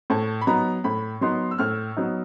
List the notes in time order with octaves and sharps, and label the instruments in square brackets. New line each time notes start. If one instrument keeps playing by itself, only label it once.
[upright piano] A2 A5
B5
F#3 B3 D#4 A#5
A2 B5
F#3 B3 D#4 C6
E6
A2 F6
F#3 B3 D#4